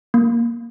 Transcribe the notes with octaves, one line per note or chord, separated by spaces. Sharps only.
A#3